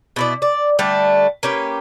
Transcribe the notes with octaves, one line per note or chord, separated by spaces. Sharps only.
B2 E4 D5
D5
D3 G3 A3 D4
A#3 C#4 G4 B4